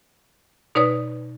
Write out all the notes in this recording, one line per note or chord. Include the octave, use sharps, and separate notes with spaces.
B2 D#4 B4 C#5 D5 D#6